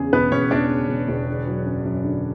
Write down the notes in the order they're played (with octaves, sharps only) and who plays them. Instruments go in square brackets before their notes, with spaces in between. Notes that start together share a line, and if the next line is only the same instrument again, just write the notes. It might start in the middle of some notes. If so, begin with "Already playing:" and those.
Already playing: [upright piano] E2 C#3 [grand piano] G#4
[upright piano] E1 [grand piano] B3 B4
[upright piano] E1 [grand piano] C#4 C#5
[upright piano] E2 [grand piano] D4 D5
[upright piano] C#3
E1
E1
D3
F#3
F#2
F#2
D3